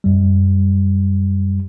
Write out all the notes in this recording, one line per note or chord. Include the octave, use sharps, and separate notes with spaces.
F#2 G3